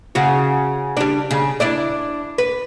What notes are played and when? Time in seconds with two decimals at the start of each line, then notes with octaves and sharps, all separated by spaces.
0.15 C#3 F#4
0.97 G3 D4
1.31 C#3
1.60 D4 E4 D5
2.38 B4